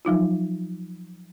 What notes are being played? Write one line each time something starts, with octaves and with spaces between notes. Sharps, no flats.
F3 F#3 D#4 F4